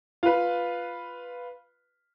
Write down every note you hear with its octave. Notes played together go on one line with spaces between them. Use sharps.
F4 B4